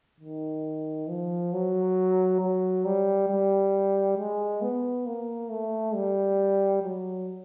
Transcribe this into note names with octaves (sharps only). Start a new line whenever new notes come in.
D#3
F3
F#3
F#3
G3
G3
G#3
B3
A#3
A3
G3
F#3